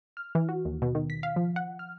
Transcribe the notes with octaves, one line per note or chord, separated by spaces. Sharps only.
F6
E3
F#4
D#2
B2
D#3
B6
F5
F3
F#5
F6